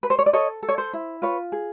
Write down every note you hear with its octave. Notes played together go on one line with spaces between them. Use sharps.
B4
C5
C#5
D5
A4 C#5 D#5
A4
C#5
C5
E4
F4 B4 C#5
G#4